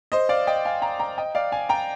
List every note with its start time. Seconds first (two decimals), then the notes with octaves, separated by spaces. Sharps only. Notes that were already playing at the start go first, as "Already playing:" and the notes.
0.12 C5 D#5
0.29 D5 F5
0.47 D#5 G5
0.65 F5 G#5
0.82 G5 A#5
1.00 G5 A#5
1.18 D#5 G5
1.35 D5 F5
1.52 F5 G#5
1.69 G5 A#5